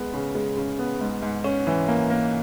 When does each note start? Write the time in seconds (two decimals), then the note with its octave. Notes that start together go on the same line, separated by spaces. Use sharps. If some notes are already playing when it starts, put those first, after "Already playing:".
Already playing: G#3 B3
0.13 C#3
0.35 G#3
0.57 C#3
0.79 B3
1.01 G#2
1.22 G#2
1.44 C#4
1.67 E3
1.88 A#3
2.10 A#3